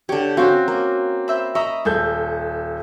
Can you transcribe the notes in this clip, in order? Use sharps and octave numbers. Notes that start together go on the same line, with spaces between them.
D3 G4 C#5
C4 C#4 F#4 F5 C#6
A#3
C5 E5 B5
D#5 E5 A#5 B5 C#6
D#1 G#4 A4 G6